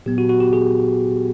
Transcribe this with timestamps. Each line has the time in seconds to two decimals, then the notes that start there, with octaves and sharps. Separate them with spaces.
0.06 A#2 F#3 B3 G4
0.18 F#4
0.29 F#4
0.40 G4
0.53 G#4